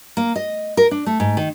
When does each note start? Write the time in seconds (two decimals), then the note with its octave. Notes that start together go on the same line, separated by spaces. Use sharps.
0.17 A#3
0.36 D#5
0.77 A#4
0.91 D4
1.06 A3
1.20 G#2
1.37 D#3